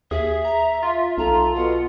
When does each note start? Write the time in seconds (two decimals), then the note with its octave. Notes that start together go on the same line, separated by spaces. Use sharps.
0.11 D#2 G#4 E5
0.45 A#5
0.83 F4
1.18 B1 A4 A#5
1.56 B2 F#5